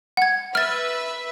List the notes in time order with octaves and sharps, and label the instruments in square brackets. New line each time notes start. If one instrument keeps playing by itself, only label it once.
[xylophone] F#5 G#6
[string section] B4 E5 [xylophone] F6 A6